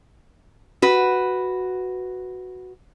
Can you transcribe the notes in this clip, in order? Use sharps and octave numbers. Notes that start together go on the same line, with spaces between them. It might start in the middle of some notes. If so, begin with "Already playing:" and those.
F#4 B4